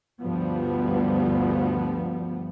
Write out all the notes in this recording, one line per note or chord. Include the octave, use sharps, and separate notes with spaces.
D2 G2 F3 G3 B3